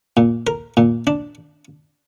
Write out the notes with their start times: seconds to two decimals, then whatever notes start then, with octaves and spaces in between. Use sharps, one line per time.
0.17 A#2
0.47 A#4
0.77 A#2
1.07 D4